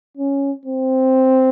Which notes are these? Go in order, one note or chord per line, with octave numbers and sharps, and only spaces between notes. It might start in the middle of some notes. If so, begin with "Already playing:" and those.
C#4
C4